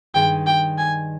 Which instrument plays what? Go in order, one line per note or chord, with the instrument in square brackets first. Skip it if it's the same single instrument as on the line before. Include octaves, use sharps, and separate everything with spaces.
[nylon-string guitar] G2 D#3 G#3 [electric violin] G5
[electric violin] G5
G#5